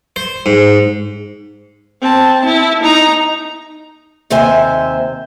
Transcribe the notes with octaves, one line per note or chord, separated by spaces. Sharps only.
C5
G#2
C4 A5
E4
D#4 A#5
D#2 C3 C5 E5 G#5